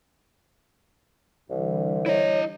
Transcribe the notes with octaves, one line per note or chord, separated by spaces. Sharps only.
C2 D3 E3 G3
E4 C#5 D#5